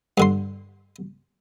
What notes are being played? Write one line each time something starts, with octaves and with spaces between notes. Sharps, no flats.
G2 D3 C6